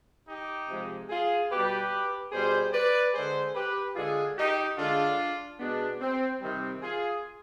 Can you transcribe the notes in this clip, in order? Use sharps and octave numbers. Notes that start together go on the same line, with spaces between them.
D#4 G4
C3 F3 G#3
F4 G#4
B2 G4 B4
G3
B2 G3 G#4 C5
B4 D5
D3 G#3 G#4 C5
G4 B4
D3 G#3 F4 G#4
D#4 G4
D3 G#3 D4 F4
B2 G#3 B3 D4
C4
C3 D#3 G3 C4
F4 G#4